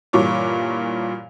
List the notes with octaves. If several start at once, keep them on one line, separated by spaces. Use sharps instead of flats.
G2 A#2 E3 C#5 D6